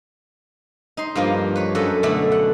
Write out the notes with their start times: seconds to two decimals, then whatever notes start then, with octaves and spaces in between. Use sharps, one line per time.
0.97 D#4 C6
1.15 G2 F3 A#3 F4
1.56 B4 C#5
1.75 F#2 A4 B4 D5 D#5
2.03 B2 D3 A3 E4 D5 B5
2.32 F#5